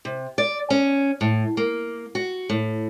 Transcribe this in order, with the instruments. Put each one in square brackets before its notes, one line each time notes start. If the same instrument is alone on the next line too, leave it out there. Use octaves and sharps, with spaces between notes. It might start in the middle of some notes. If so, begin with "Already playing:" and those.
[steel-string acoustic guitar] C3
D5
C#4
A2
A#3
F#4
A2